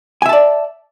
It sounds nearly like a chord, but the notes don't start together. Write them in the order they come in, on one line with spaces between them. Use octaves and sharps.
G#5 E5 A5 D5